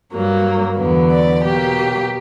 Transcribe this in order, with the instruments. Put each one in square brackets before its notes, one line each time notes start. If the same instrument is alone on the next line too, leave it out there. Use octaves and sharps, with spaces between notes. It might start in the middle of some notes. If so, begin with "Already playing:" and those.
[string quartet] G2 F#3 A#3
E2 D3 F#3 B3
D5
B2 F#3 A#3 G4